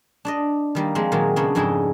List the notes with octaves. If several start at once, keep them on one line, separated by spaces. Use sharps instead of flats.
D4 D5 D#5
D#3 G3 A#3
F3 G#3 A#3 C4
A#2 D#3 F#3 G#3
C#3 F#3 B3 D4
F2 G#2 G#3 E4 G#4 G5